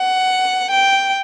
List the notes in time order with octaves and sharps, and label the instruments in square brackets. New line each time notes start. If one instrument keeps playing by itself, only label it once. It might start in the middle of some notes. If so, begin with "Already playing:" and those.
Already playing: [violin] F#5
G5